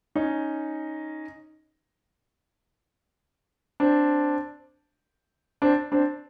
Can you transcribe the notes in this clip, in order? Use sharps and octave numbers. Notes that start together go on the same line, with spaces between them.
C#4 D#4
C4 D4
C4 D4
C4 D4